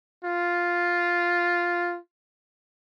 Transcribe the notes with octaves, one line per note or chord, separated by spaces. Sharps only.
F4